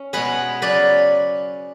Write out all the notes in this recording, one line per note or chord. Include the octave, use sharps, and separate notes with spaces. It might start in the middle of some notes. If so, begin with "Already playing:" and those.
Already playing: C#4
B2 G#3 B3 G#4 B4
C#3 F#3 C#4 B4 D5